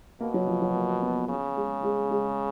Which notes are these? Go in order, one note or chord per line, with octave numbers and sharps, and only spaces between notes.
B2 A#3
F#3
F3
F#3
A#3
B3
C#3
G#3
G#3
G#3